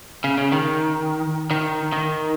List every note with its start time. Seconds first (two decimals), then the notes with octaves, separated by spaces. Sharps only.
0.24 C#3
0.38 C#3
0.52 D#3
1.51 D#3
1.92 D#3